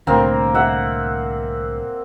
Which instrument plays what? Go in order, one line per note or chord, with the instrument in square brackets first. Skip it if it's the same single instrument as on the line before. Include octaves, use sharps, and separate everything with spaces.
[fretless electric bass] C2 A2 D3 [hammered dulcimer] A#3 C4
[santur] E5 F#5